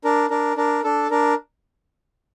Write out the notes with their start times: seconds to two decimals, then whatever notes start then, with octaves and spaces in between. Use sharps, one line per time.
0.04 D4 A#4
0.30 D4 A#4
0.57 D4 A#4
0.84 D4 A4
1.11 D4 A#4